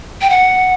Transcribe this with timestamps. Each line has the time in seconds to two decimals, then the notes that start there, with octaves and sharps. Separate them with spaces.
0.22 G5
0.30 F#5